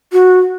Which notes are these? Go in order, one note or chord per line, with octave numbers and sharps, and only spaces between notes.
F#4